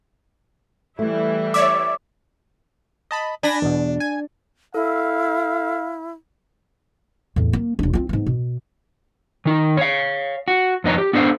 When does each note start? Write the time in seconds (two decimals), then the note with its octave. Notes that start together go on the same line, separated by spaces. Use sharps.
0.99 E3 G3 A3 E4
1.54 C#5 D5 E5 D6
3.11 D#5 A5 B5
3.43 D4 G#5 B5 A#6
3.62 E2 B2
4.00 G#5
4.74 E4 A4 F5
7.36 E2 A2
7.53 A#3
7.79 E1 D4
7.93 C4 F4
8.09 G#2 B3
8.26 B2
9.46 D#3 D#4
9.77 C#5 F5
10.48 F#4
10.84 F2 B3 D#4 C#5 A#5
10.98 G4
11.13 B3 D4 A4 C5 D#5 F5